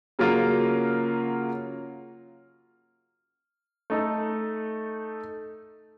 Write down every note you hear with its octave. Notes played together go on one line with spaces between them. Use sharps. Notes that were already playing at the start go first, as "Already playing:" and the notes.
C#3 F#3 A#3 F4
A3 D#4 A4